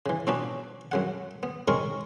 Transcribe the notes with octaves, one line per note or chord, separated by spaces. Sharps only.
C#3 E3
B2 F3 B3 C#4 D4 B4
F#2 C#3 F#5
B3
D#3 G#3 C4 C#4 A#4 C#6